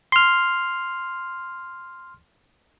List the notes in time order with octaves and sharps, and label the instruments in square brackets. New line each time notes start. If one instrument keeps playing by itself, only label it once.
[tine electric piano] C6 F6